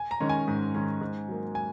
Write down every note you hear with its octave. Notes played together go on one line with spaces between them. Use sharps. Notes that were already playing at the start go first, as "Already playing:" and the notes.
Already playing: G#5
A#5
D#3 G#3 C#4
G#5
G#2
D#3 G#3 C#4
G#2
F#3 A#3
G#5